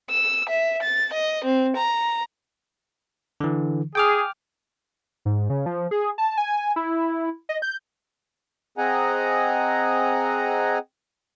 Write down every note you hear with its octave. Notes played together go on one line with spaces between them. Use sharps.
E6
E5
A6
D#5
C4
A#5
D3 E3
G#4 G5 D6 F6
G#2
C#3
F3
G#4
A5
G#5
E4
D#5
G6
C4 G#4 D#5 F#5 G#5 A#5